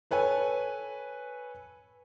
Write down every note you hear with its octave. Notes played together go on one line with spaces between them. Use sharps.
A4 B4 C#5 G#5